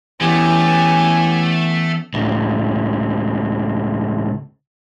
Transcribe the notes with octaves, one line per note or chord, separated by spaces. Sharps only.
E3 A3 B3 C#4 G4 G#5
C#2 A2